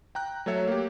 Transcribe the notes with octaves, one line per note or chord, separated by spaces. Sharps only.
G5 A#5 F#6
F#3 A3 A4 C#5 E5
A#3 G4